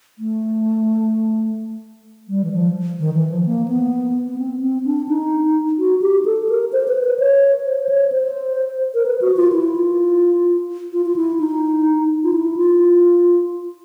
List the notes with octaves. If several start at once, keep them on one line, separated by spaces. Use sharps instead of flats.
A3
G3
E3
F3
D#3
E3
F3
A#3
B3
B3
C4
C4
D4
D#4
F#4
G4
A4
A#4
C5
B4
B4
C#5
C5
C#5
C5
A#4
B4
F#4
F4
E4
F4
F4
F4
E4
D#4
F4
E4
F4